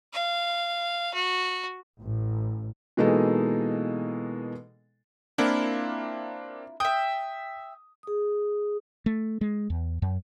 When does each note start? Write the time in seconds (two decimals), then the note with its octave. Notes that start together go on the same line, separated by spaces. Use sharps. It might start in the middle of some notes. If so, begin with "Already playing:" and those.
0.13 F5
1.14 F#4
2.02 A1
2.97 B2 E3 G#3 A#3 D#4 A4
5.38 A#3 C4 D4 E4 F4 A#4
6.80 E5 G5 D#6
8.03 G#4 D#6
9.06 A3
9.41 G#3
9.70 E2
10.02 F#2